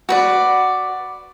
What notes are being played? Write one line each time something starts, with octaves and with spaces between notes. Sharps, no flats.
F#4 B4 D5